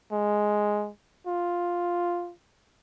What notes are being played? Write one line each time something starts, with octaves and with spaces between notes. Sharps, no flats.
G#3
F4